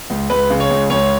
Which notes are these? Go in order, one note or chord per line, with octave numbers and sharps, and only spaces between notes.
C#2
C#2 B4
C#3
C#5
C#2
C#2 C#5